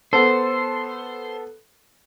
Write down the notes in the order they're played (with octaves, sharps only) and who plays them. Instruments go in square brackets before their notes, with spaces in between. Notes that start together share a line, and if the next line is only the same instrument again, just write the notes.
[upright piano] B3 A4 [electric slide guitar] C5